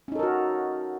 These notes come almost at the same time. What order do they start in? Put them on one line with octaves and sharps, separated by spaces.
C#4 D#4 A4 A#4 F#4